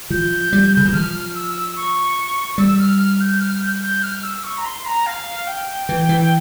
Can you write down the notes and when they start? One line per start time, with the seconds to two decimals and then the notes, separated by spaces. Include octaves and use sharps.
0.10 F3 G6
0.53 G3
0.77 C#3
0.85 E3
0.93 F3 F6
1.35 E6
1.76 C#6
2.58 G3 E6
2.79 F6
2.99 F6
3.21 G6
3.41 F6
3.62 G6
3.83 G6
4.03 F6
4.23 E6
4.44 C#6
4.57 A#5
4.65 C6
4.85 A#5
5.06 F5
5.47 G5
5.89 E3
6.09 E3